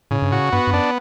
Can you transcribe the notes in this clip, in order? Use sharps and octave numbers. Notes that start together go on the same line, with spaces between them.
A2 C#3
G2
A2 F#4
G2 B3
G2
F#2 D4